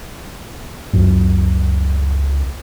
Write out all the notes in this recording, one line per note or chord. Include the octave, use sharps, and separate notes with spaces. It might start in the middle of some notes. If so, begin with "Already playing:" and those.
C#2 F#2